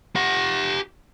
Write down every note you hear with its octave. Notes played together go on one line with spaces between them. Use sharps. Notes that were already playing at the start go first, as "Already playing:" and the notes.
G4 F#5